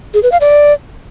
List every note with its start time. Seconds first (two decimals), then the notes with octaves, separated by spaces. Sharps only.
0.14 G#4
0.23 B4
0.32 F5
0.41 D5